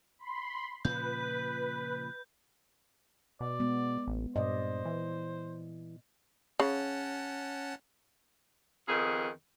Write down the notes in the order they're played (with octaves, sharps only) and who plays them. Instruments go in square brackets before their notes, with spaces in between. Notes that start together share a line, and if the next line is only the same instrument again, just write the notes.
[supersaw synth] B5 C6
[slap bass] A#2 C#3 F3 [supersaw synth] B4 [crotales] G6
[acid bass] B2 [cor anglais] D5
[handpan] G#3 B3
[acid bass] A1
[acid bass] G2 [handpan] A#2 D5 D#5 [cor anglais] C5
[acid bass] E3
[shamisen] C#3 [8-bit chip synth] C#4 F#5 A5
[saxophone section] F2 D#3 B3 G#4